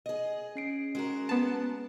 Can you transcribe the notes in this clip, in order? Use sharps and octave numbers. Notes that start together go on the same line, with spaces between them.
G#4 D#5
C#4 C7 D7
G#3 F#4 A#4
B3 A5